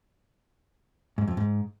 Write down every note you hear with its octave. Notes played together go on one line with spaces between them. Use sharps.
G#2
F2
G#2